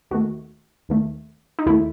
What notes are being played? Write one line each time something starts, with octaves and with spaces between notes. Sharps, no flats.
D#2 D#3 A3 F#4
D#2 D#3 A3
D#4
D#2 D#3 A3 E4